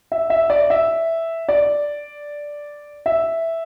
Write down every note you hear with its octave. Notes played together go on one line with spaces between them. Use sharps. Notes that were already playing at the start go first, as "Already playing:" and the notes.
E5
E5
D5
E5
D5
E5